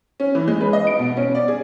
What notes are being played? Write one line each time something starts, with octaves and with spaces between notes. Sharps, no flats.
C#4
E3
G#3
B4
D#5
D7
B2
C#4
D5
G#4